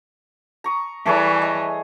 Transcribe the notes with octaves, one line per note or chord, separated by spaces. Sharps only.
A#5 C#6 D#6
E3 G3 A3 G#4 C#5
D#5